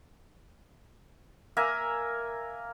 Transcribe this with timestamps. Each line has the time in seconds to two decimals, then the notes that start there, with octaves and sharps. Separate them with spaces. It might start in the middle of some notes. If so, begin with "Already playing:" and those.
1.57 A#3 A#4 E5 G#5